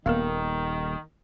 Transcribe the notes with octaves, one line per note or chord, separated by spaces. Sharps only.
D#1 D#3 A#3 B3 A#4